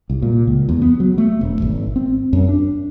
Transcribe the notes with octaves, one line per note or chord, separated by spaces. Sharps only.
C2
A#2
C#2
E2
B3
F#3
A3
E1
G#1
C4
F#2
D4